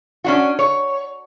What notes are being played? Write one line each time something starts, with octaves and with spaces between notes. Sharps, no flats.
C#4 D4 F#4
C#5